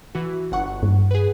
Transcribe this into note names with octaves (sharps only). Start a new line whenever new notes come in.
E3 F#4
G1 F#5 C#6
G2
G#4 B4